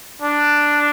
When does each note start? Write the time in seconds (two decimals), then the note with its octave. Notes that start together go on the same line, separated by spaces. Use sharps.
0.22 D4